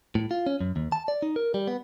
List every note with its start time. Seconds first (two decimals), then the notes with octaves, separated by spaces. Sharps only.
0.15 A2
0.31 F4
0.47 C#4
0.61 F#2
0.76 D#2
0.92 A5
1.08 D5
1.22 D#4
1.36 A#4
1.54 G3
1.67 B3